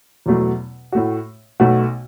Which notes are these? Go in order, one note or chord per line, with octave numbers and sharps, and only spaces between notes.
E2 B2 F#3 A3
A2 A3 F#4
B1 B2 A3 F#4